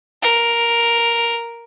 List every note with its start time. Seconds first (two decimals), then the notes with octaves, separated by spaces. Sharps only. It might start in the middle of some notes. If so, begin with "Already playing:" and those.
0.22 A#4